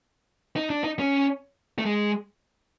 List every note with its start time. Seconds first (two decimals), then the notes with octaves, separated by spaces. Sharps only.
0.56 D#4
0.70 D4
0.84 D#4
0.99 C#4
1.78 A3
1.85 G#3